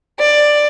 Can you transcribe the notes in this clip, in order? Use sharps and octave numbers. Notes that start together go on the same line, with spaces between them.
D5